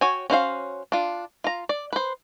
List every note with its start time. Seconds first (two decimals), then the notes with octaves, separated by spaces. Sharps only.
0.01 F#4 C#5 G5 G#5
0.30 C#4 F#4 C5 F5
0.92 D4 F4
1.44 F4 A#5
1.69 D5
1.93 B4 C5